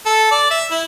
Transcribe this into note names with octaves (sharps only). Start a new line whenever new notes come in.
A4
D5
E5
E4